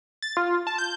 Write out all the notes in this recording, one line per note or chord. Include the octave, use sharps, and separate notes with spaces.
A6
F4
A5
G6